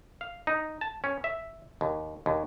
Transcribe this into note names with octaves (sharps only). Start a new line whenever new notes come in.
F5
D#4
A5
C#4
E5
D#2
D#2